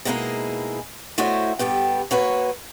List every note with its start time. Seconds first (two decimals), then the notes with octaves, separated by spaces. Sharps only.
0.05 B2 G#3 A#3 D#4 E4 G#4
1.18 A3 E4 F#4 C5 C#5 D#5
1.59 G2 B3 G4 A4
2.11 A#3 F#4 B4 C#5